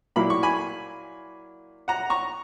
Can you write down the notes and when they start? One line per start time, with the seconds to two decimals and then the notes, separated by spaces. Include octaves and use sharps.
0.16 A#2 F#3 A#3 E4 B5
0.30 C#6
0.43 G#5 B5
1.88 F#5 A#5
2.10 A#5 C#6